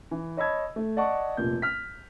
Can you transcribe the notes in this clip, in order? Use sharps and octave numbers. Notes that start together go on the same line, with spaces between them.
E3
C#5 D#5 A5 B5 E6 G#6
A3
D5 D#5 F#5 A5 C#6
F1 A#2 G6
F6 B6